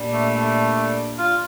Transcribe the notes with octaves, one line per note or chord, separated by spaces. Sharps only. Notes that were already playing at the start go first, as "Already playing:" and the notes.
Already playing: A#2 G3 D4
A3
A3
F4